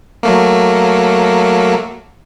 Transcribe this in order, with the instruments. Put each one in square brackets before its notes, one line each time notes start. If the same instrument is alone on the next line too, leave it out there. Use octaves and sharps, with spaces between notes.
[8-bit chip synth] F#3 A3 A#3